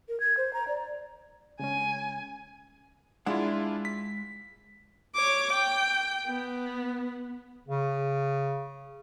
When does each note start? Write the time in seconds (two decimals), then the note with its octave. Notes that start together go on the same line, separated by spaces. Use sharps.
0.09 A#4
0.20 G#6
0.37 C5
0.53 A#5
0.68 D5
1.60 C#3 G#3 C#4 G#5
3.26 G#3 D4 E4 F4 F#5
3.85 B6
5.15 C#5 D6
5.53 G5
6.27 B3
7.68 C#3